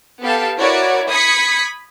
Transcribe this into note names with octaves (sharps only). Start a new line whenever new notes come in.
B3 G4 A4 F5 A5
E4 F#4 A#4 C#5 D5 F#5
B5 D#6 G#6 B6 C#7